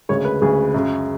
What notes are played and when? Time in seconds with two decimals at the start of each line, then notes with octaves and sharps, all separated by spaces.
0.09 D2 C#3 G#3 C#5
0.25 B4
0.41 D2 C#3 G#3 G#4
0.74 F#2 C#3 G#3